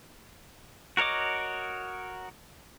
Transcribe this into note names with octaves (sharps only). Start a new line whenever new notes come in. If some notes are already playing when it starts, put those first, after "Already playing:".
F#4 A#4 C#5 D#5 D6